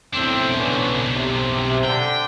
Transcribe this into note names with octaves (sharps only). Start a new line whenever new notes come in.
B1 A2 C4 D4
D3 E3 C#4
C3
D3 G5